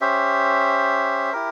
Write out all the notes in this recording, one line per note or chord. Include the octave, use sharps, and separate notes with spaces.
C#4 G4 C5 E5
E4 G4 A#4